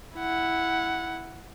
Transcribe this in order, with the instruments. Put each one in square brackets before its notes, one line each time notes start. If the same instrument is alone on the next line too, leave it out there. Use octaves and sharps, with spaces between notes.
[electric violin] E4 F#5